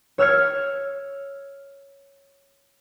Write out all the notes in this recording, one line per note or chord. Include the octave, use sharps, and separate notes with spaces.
C#5 E6 F6 G#6 C#7